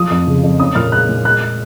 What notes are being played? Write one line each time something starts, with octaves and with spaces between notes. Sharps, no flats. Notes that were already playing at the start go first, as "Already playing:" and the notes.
Already playing: F3 D#6
F2
C#3
F2
C#4 D#6
A#2 F6
G#3 F#6
A#2
G#3 F#6